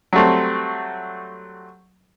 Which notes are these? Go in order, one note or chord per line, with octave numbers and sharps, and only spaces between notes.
F#3 G3 A3 C4